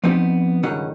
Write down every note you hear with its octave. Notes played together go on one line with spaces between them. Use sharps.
F3 B3 C4 D#4 G4
C#2 G2 D#3 G3 C#4 F#5